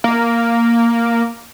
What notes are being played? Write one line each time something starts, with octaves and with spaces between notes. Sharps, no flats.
A#3